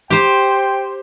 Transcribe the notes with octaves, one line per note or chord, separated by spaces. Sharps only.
G4 C5 G5